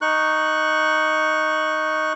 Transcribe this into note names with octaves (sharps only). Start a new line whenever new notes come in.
D#4 C#6 F#6